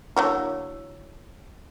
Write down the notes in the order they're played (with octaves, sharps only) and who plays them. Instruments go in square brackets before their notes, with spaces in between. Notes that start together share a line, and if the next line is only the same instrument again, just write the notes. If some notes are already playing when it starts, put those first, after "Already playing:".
[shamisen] D3 F#3 A#3 [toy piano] E4 C#5 E6